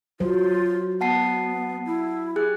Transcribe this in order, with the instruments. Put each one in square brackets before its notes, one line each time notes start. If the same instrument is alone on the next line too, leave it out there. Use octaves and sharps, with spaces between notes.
[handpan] F#3 C5 [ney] F4
[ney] B3 [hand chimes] F#5 A5 C7
[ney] E4
[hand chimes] G4 G#4 F#6